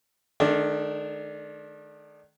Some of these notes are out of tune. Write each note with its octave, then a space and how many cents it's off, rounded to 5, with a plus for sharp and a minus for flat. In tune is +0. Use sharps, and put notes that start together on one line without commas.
D#3 -20 A3 -40 D4 +0